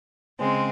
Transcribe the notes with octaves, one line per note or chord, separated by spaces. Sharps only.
C#3 G#3 C4